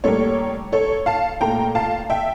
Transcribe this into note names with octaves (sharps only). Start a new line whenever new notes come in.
A2 G3 A#3 A4 C#5
A4 C#5
F5 A5
A#2 A3 G5 A#5
F5 A5
E5 G5